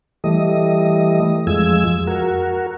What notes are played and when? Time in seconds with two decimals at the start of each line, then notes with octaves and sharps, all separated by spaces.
0.24 E3 G3 A3 D#5
1.47 F2 F3 G#3 E6 G#6
2.07 F#4 A#4